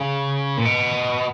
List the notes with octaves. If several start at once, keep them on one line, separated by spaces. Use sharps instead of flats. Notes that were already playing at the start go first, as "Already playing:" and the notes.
Already playing: C#3
A#2
B2